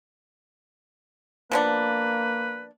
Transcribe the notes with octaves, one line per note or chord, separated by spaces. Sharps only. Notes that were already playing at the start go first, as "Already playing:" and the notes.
F3 A#3 B3 D4 B4